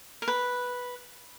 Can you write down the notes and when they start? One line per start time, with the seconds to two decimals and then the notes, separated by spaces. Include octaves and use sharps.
0.22 A#4
0.28 B4